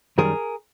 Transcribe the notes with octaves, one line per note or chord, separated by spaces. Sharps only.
F#2 D#3 G3 G#4 A#4